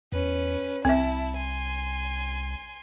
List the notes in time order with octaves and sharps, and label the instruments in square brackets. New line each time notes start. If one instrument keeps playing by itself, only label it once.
[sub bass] E2 [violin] C#4 B4
[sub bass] C2 [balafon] C4 E5 [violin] E4 A5
[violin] G#5 C6